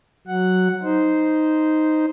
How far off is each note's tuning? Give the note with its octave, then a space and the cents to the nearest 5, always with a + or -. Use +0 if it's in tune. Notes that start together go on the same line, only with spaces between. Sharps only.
F#3 +0 F#5 +0
D#4 +0 C5 -10